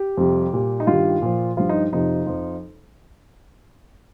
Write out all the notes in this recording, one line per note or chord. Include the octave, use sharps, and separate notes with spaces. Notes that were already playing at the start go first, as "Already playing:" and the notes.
Already playing: G4
F2 C3 G3
A#2 G3
D#4
G2 D#3 G3 F4
A#2 F3
G2 F3 F4
D#4
F2 C3 F3 D#4
F2 F3